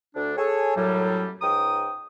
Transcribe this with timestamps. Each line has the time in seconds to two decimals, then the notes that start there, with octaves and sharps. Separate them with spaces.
0.16 D2 D4
0.37 G#4 A4 C#5
0.76 F#2 A2 F#3 G3
1.42 C#2 G#2 G5 A#5 D#6